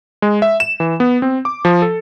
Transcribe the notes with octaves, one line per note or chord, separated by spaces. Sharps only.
G#3
E5
E7
E3
B3
C4
D6
F3
A4